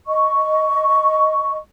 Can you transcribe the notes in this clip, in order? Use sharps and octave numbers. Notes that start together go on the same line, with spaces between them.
D#5 C#6